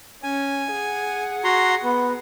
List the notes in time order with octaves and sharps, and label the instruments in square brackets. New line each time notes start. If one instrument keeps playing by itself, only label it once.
[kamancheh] C#4 [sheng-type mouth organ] G#5
[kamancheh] G#4 F#5
[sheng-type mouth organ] F#4 A#5 C6
B3